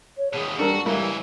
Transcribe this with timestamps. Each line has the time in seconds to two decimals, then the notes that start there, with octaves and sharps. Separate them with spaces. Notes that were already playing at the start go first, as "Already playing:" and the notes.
0.17 C#5
0.33 D#2 B2 G#4
0.59 G3 D4 F#4 A4 A#4
0.86 C#2 E3 G3 A#3 E4